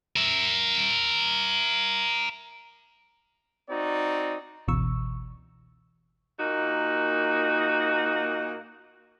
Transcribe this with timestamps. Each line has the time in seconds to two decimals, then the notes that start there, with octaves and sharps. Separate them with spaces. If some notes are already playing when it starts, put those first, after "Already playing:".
0.16 A#4 E5
3.69 C4 D#4 F#4 D5
4.68 G1 C#2 B2 E3 C#6 E6
6.39 A#2 A#3 D#4 F#4